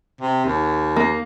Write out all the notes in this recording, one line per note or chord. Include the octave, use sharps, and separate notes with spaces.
C3
D#2
A#3